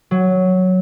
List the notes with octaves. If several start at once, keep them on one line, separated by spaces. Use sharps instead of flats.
F#3